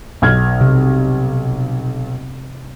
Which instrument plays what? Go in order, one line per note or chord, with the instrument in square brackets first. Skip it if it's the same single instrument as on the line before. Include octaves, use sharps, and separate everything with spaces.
[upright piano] B1 F6 G#6
[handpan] C3